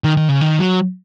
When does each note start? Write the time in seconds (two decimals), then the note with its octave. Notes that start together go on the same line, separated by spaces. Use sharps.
0.04 D#3
0.17 D#3
0.29 C#3
0.41 D#3
0.59 F#3